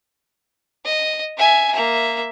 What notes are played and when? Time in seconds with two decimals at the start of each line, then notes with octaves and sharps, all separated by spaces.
0.85 D#5
1.38 E5 G#5
1.73 A#3 E5